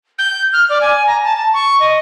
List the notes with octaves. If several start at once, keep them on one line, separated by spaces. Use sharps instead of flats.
G6
F6
D5
G#5
A#5
A5
A5
C#6
D#5